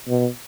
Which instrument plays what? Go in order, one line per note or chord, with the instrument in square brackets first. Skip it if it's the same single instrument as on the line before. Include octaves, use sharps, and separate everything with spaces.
[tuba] B2